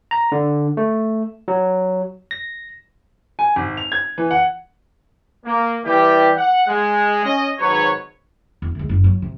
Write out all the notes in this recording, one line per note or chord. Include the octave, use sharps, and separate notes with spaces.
A#5
D3
A3
F#3
A#6
G#5
G#1
F7
G#6
E3
F#5
A#3
E3 G3 G4
F#5
G#3
C#4 D#5
G#1 G#2 F#3 B4 C#5
E1
D2 G#3
F#1
F#3
C3